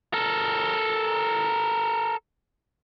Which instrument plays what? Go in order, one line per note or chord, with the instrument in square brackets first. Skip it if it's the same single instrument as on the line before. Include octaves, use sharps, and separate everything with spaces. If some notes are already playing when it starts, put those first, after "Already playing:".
[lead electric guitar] A4 A#4